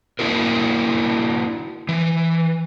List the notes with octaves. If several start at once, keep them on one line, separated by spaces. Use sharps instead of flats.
A#3 D4 E4 F#4 A#4
E3